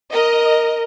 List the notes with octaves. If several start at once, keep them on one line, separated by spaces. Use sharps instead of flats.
A#4 D#5